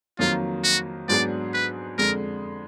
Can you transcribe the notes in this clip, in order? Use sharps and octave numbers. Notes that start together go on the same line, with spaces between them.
F2 D#3 F#3 A#3 F4
F#4
G#2 F#3 B3 D4 G#4 D5
B4
F2 D3 G#3 A#4